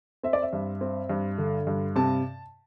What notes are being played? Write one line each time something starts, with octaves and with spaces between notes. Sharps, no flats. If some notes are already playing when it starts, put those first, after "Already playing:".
C4 E5
D5
E5
G2
C4
G2
D3
G2
C3 A5